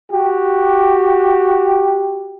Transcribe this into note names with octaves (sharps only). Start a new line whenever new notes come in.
F#4 G4